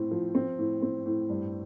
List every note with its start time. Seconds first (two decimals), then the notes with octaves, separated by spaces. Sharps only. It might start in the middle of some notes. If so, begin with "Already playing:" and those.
Already playing: A2 C4
0.11 F3
0.35 C4
0.59 A2
0.82 C4
1.06 A2
1.29 G2